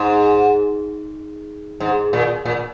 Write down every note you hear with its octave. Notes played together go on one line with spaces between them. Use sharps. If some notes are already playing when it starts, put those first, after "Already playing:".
Already playing: G#2
G#2
A#2
A#2